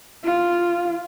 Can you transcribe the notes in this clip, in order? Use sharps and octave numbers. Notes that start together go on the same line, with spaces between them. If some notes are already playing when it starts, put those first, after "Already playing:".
F4